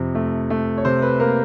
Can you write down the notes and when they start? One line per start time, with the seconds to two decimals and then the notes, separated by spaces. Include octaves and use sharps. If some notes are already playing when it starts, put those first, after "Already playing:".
Already playing: F2 C3
0.15 A3
0.50 A3
0.78 C#5
0.85 C3 C5
1.02 B4
1.20 A#3 A#4